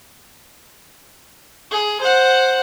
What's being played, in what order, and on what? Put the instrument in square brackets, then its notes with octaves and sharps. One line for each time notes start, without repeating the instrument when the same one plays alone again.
[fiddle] G#4
C5 F#5